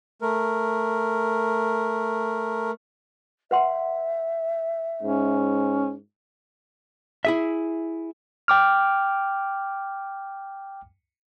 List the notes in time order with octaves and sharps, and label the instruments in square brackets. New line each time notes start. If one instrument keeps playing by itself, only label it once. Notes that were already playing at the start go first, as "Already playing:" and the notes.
[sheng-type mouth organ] A3 A#4
[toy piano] B4 F#5 C6 [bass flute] E5
[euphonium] G#2 [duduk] C#4
[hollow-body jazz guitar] E4 G#4 E5
[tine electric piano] G5 D6 F6